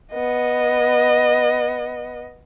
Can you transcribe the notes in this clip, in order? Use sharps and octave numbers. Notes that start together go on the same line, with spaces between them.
B3 D#5